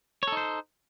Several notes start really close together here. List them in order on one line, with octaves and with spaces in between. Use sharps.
C#5 A4 D#4 C5